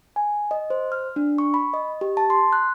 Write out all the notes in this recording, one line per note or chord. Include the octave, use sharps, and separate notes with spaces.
G#5
D#5
C5
F6
D4
C#6
B5
D#5
G4
A5
C6
F#6